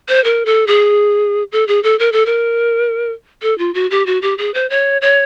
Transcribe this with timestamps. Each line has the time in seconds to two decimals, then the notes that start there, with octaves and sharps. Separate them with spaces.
0.09 C5
0.24 A#4
0.46 A4
0.67 G#4
1.52 A4
1.68 G#4
1.83 A4
1.99 A#4
2.12 A4
2.26 A#4
3.42 A4
3.58 F4
3.74 F#4
3.91 G4
4.06 F#4
4.22 G4
4.38 G#4
4.54 C5
4.70 C#5
5.02 C#5